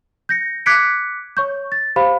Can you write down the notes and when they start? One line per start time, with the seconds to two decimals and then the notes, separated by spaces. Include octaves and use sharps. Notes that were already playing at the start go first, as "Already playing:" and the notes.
0.29 G6 A#6 C#7
0.66 D6 F#6 G#6 B6 C#7 D7
1.37 C#5 C#6 G6
1.72 A6
1.96 G4 C5 F5 B5